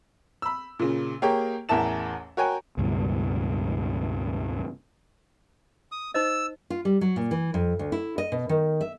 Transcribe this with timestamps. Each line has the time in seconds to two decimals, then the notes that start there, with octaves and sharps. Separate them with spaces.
0.42 B5 E6
0.79 A#2 C#3
1.22 A#3 G4 G#4 A#4 C#5 G5
1.69 A1 E2 A#4 E5 A5 E7
2.37 F#4 A#4 C#5 G5 G#5
2.78 C#2 G2 B2
5.92 D#6
6.14 D#4 C5 D#5 E6
6.70 F4
6.85 G3
7.01 F#3
7.16 A#2
7.31 E3
7.54 F2
7.79 D2
7.92 E4
8.18 D#5
8.32 B2
8.49 D#3
8.81 E5